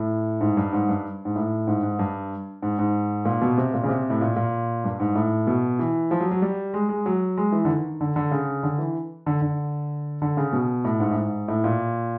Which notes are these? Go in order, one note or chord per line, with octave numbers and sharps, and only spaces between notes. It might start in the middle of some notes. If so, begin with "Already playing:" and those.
Already playing: A2
G#2
G2
G#2
G2
G#2
A2
G#2
G#2
G2
G#2
G#2
A#2
B2
C3
A#2
C#3
C3
A2
A#2
A#2
G2
G#2
A2
B2
E3
F3
F#3
F#3
G3
G#3
G#3
F#3
G#3
E3
D3
D#3
D3
D3
C#3
D3
E3
D3
D3
D3
C#3
B2
A2
G#2
A2
G#2
A2
A#2